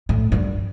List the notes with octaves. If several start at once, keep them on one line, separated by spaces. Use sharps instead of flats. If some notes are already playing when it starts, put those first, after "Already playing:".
A2
G2